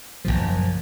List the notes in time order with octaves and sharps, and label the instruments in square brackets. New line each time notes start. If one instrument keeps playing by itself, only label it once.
[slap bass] F#1 C2 A#2 F3